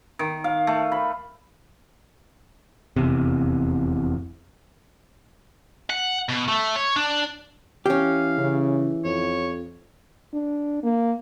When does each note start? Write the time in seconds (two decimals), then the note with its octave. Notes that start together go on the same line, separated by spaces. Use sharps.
0.19 D#3
0.44 F5
0.67 A3
0.92 B5
2.96 F1 E2 C3
5.90 F#5
6.29 B2
6.48 A3
6.76 C#5
6.96 D4
7.86 E3 C#4 G4 F5
8.38 C#3
9.04 F2 C#5
10.33 D4
10.83 A#3